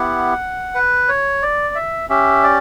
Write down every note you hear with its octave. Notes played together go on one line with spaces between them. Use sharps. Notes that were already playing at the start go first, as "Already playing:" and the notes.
Already playing: B3 E4 G4 F#5
B4
C#5
D5
E5
C#4 G4 E5
D5